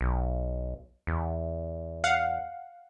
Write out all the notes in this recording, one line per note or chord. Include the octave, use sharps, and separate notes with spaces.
B1
E2
F5 F#5